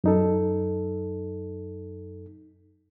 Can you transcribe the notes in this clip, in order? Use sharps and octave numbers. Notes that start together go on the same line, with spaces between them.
F#2 D#4 A4